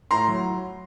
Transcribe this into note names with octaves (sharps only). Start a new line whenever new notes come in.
A2 A#5 C6
F#3